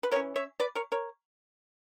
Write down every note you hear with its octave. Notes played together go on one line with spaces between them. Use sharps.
B4
E3 A#3 C#4 A#4 C#5
C#5 E5
B4 D5
A#4 C#5
A#4 C#5